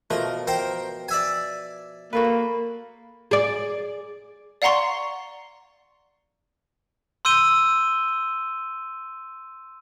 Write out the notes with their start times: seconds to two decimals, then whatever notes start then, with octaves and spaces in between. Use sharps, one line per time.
0.10 B2 F3 A3 A#4
0.47 A#4 C5 G5
1.08 D5 E5 G#5
2.13 A#3 F#4 A4 B4
3.31 G#4 D5
4.62 D5 F5 F#5 A#5 C6 C#6
7.25 C6 E6 G6 D#7 G7